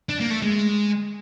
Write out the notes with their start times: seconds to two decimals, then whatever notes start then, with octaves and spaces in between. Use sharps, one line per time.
0.09 D4
0.20 A#3
0.31 A3
0.42 G#3